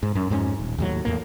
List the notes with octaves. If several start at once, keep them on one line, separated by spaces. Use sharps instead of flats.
G#2
F#2
F2 G#2 G3 C#4
D#1
D#2 A2 F#3
E2 A2 A#3